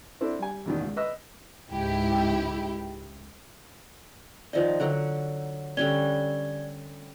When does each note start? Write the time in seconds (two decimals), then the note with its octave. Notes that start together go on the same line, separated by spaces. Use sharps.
0.21 C4 D4 E4 A4
0.39 G3 G#5
0.65 E2 B2 D#3
0.81 C#2
0.96 B4 D#5 E6
1.70 C#2 G#2 E4 G4
4.53 D#3 F3 D5 D#5
4.80 D3 F#3 C#5 F#5
5.77 D3 G3 C#4 D5 G#6 G7